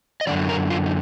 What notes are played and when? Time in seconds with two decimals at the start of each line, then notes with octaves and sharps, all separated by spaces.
0.21 D#5
0.27 F#2 D3 F3 D5
0.49 A#4
0.70 F4
0.86 D#4